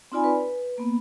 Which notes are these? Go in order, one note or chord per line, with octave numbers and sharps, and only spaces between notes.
C4 D#4 F4 D5 G#5 B5
B4
A#3 B3